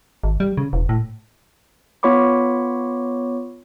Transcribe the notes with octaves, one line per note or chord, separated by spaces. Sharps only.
G#1
G3
C#3
E1
A2
B3 F4 C#5 B5 C#6 D6